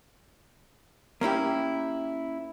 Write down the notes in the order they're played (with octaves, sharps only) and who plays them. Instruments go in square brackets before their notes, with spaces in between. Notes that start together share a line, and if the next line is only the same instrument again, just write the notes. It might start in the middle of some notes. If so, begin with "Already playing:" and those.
[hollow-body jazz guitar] A#3 C#4 E4 G4